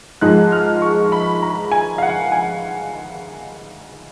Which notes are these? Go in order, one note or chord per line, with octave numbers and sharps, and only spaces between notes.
G#2 F3 G#3 D#4 F#6
F6
C#6
B5
A#5
G#5
F5
F#5
G#5